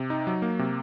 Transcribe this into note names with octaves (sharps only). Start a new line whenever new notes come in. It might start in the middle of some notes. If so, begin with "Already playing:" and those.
Already playing: C3
D#4
F#3
A#3
C3